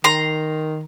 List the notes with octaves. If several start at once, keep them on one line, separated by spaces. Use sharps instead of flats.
D#3 A#5 C6